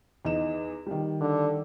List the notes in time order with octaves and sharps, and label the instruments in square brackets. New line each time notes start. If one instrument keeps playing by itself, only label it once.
[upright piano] E2 D#4 E7
D#3 G3
[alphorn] D3